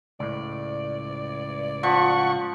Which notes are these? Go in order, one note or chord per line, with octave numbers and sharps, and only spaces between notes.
C#2 A2 D5
F3 F#5 C#6